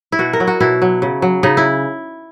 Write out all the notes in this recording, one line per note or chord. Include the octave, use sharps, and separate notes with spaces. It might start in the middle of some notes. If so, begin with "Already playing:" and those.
E4
B2 F#4
A#4
F#3
F#4
B2 E4
F#3
C#3
F#3
C#3 D#4
E4